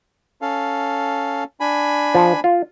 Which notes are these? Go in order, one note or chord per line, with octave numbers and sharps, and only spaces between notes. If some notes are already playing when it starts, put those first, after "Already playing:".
C#4 A4 F5
D4 G#5 B5
F3
F4